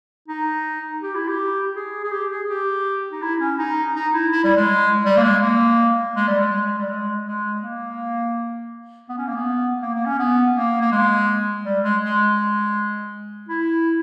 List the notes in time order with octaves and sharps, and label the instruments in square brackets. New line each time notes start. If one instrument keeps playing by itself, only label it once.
[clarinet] D#4
G4
E4
G4
G#4
G#4
G4
G#4
G4
D#4
E4
C#4
D#4
D#4
E4
E4
G3
G#3
G3
A#3
G#3
A#3
G#3
G3
G#3
G3
G#3
G#3
A#3
B3
C#4
A#3
B3
A#3
A#3
C#4
B3
A#3
A#3
G#3
G3
G#3
G#3
E4